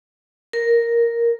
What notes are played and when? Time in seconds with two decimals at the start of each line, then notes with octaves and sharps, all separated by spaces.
0.53 A#4